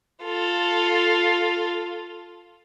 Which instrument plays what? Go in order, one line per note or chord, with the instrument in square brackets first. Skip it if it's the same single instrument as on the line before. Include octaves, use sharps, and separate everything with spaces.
[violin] F4 A4